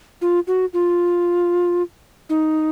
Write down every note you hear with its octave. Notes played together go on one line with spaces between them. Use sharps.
F4
F#4
F4
D#4